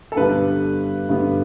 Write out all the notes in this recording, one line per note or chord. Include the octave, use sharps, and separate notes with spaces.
A4
G2 D3 G3 B3 B4
G2 D3 G3 B3